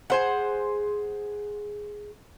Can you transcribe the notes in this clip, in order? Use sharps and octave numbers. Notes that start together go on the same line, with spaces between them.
G#4 C5 F#5